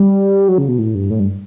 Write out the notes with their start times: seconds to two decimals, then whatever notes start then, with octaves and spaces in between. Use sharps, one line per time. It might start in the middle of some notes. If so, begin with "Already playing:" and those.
Already playing: G3
0.48 F#3
0.58 C#3
0.68 B2
0.79 A2
0.95 G2
1.10 A2
1.20 G2